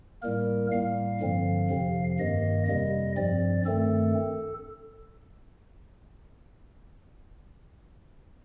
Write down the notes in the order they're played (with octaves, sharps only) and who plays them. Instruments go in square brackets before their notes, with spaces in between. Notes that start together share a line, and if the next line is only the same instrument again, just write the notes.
[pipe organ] A2 G3 A#3 A#4
A2 G3 A#3 F5
G2 D3 F3 C4
F2 C3 F3
G2 D#3 A#3 D#5
F2 C3 G3 D#5
G2 F3 C4 D5
G2 D#3 A3 C4 A4